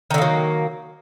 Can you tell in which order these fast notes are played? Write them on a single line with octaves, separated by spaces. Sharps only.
D#3 D3 A#3 F#3